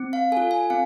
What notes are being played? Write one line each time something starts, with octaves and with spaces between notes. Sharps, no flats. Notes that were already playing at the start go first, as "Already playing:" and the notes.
Already playing: C4
F5
F4 A4 G#5
G#5
C4 F5